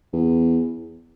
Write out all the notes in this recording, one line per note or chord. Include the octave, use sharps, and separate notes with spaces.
E2